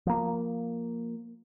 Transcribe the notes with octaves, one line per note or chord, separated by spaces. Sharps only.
F3 A#3